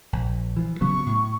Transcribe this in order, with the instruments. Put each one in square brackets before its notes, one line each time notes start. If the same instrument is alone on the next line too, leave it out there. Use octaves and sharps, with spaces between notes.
[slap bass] A#1
E3 F3
[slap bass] C#3 F#3 B3 [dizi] C#6
[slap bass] A2